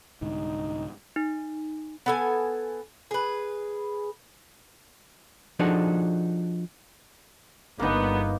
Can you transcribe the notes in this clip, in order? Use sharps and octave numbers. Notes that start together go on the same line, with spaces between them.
C2 G#2 D3 D#4
D#4
B3 A4 G#5
G#4 B4
F3 D4 D#4 F#4 G#4 A4
G1 A#3 B3 D#4